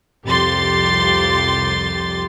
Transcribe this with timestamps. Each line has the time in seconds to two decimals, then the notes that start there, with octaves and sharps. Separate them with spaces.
0.25 C2 F2 G4 C6 A6